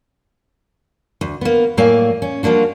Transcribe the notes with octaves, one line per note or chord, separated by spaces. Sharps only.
D2
A#3 B3
A2 F#3 A#3 D5 F5 G#5
C#4
F3 G3 A#3 D4 F#4